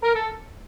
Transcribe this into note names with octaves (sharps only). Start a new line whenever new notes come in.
A#4
A4